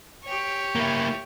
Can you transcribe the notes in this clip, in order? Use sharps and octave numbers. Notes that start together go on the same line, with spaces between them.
G4 C#5
A#3 E4